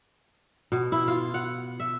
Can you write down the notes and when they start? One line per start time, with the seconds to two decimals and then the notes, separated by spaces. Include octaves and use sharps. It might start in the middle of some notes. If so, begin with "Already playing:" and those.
0.72 B2
0.92 E4
1.08 F4
1.34 F#5
1.80 E5